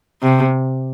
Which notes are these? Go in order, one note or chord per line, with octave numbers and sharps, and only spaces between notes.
C3